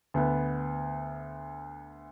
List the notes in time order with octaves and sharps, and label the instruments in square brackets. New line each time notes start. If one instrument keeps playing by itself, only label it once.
[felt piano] D2 B3